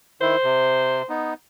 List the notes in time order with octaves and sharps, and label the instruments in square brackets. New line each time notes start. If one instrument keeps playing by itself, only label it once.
[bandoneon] D#3 E4 [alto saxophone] C5
[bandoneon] C3
B3 D#4